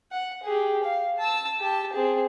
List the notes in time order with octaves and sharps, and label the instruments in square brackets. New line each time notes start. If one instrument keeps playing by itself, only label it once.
[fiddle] F#5
G4 G#4
F5
A5 E6
G4 A5
C4 G#4